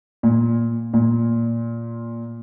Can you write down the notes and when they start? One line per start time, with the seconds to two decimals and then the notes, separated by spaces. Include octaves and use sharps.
0.23 A#2
0.93 A#2